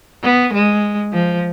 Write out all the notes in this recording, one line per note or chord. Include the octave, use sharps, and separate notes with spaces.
B3
G#3
F3